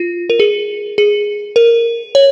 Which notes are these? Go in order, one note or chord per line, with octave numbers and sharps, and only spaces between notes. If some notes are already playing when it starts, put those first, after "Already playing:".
Already playing: F4
A#4
G#4
G#4
A#4
C#5